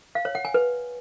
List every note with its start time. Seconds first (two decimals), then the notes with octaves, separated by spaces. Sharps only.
0.15 F5
0.25 C#5
0.35 F#5
0.45 G#5
0.54 B4